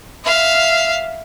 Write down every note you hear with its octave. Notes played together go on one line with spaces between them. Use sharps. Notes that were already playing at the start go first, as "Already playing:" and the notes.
E5 F5